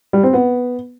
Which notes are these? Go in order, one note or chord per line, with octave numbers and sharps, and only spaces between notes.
G3
C4
B3